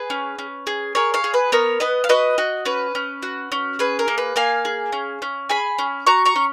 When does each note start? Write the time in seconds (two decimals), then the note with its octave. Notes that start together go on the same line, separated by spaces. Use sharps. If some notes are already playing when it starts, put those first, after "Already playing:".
Already playing: G#4 B4
0.10 C#4
0.39 C#4
0.67 G#4
0.95 G#4 A#4 C#5
1.14 C#5 F5
1.24 G#4
1.34 B4
1.52 B3 A#4 C#5
1.80 B3 B4 D#5
2.04 F5
2.09 F#4 B4 D#5
2.38 F#4
2.65 C#4 B4
2.95 C#4
3.23 F#4
3.52 C#4
3.79 G#4 B4
3.99 A#4
4.08 A#3
4.18 B4
4.36 A#3 F5 G#5
4.65 G#4
4.92 C#4
5.22 C#4
5.49 G#4 G#5 B5
5.79 C#4
6.07 F#4 A#5 C#6
6.26 A#5 C#6
6.36 C#4